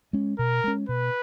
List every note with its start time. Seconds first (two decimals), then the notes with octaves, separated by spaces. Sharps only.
0.13 G#3 C#4
0.38 B2 A#4
0.64 G#3 C#4
0.89 B2 B4